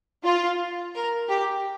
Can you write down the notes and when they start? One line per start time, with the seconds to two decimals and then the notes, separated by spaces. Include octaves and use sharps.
0.24 F4
0.95 A#4
1.29 G4